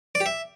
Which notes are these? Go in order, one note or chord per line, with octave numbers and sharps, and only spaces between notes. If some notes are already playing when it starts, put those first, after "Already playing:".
D5
G4
E5